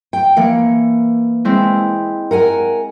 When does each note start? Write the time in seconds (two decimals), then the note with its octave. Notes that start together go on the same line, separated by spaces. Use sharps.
0.13 G5
0.37 E3 A#3 C#7
1.45 G#3 C4 E4
2.31 A#4 F#5 G#5